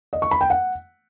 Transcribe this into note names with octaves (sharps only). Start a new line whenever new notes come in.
D#5
C#6
B5
G5
F#5